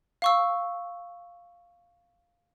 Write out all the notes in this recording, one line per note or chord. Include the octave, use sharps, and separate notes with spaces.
F5 C#6 E6